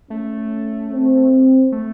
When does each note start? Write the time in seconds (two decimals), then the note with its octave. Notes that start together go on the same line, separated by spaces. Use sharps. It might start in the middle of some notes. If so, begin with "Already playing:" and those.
0.10 A3 C#4
0.91 C4
1.72 A3